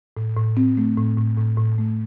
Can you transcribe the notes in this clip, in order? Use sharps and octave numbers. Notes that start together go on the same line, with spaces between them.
A2
A2
C4
A3
A2
A2
A2
A2
A3